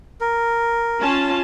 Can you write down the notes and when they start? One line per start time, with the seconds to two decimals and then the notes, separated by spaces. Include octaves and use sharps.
0.21 A#4
0.99 C#4 F4 A5